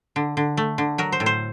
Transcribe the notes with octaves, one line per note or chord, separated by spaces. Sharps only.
D3
D3
A3
D3
F#3 A#4
C5
A2
C5